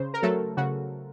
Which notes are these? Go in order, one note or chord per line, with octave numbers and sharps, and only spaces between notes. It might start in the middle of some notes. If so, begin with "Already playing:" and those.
Already playing: C#3 C5
A#4
F#3 A3 A4
C#3 F#4